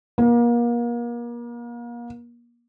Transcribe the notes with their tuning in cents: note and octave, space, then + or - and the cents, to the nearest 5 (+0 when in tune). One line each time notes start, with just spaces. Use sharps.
A#3 +35